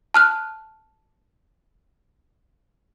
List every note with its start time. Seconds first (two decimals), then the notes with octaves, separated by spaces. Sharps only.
0.14 A5 F6 F#6